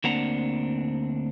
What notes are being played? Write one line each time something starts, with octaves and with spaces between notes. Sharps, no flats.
D2 A#3 C4 D4 F#5 A#5